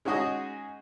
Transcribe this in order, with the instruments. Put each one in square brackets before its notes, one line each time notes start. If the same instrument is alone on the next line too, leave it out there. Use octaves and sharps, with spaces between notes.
[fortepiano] G#3 C#4 D#4 F#4 G#4 D#5